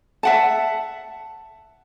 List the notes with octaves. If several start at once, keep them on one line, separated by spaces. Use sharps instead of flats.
E5 F#5 A5